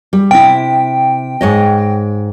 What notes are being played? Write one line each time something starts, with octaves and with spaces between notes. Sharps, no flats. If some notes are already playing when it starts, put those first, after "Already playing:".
G3
C3 E4 G5
G#2 C#5 D#5